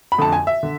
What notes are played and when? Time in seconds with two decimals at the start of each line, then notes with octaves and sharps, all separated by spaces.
0.12 B5
0.18 F2 D3 A3 A5
0.32 G#5
0.47 E5
0.63 D3